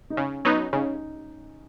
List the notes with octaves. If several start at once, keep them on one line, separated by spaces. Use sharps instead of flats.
D#4
C#3 C#4
F#3 B3 D#4
C#3 D#4